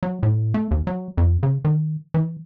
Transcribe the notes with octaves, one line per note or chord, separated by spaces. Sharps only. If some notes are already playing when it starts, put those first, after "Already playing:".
F#3
A2
A3
D#2
F#3
F2
C#3
D#3
E3